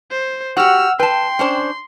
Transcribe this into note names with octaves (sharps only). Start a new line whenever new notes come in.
C5
F#4 G4 F#5 E6 F6
B4 G5 A5 C6
C#4 D4 C5